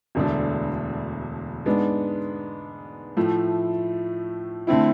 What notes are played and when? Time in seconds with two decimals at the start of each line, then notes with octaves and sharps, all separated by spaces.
0.15 E1 D2 D3 A3 D4
1.66 G#2 G#3 B3 D4
3.17 A2 F3 A3
4.67 D3 A3 C4 E4